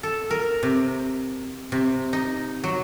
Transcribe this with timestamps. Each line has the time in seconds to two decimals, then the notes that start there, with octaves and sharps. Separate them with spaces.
0.03 A4
0.31 A#4
0.63 C3
1.72 C3
2.13 D#4
2.64 F#3